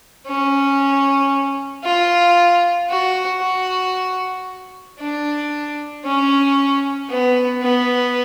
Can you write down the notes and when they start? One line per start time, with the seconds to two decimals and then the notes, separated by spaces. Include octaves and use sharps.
0.26 C#4
1.84 F4
2.89 F#4
3.41 F#4
4.99 D4
6.05 C#4
7.09 B3
7.62 B3